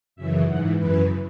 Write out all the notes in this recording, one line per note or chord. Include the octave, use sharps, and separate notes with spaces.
F#2 C#3 E3 E5
G#2 E3 F#5
F#2 C#3 E3 B4